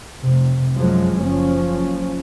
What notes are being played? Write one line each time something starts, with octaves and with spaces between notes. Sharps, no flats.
F1 C3
F#2 F3 F#3 G#3
F#1 F3 C#4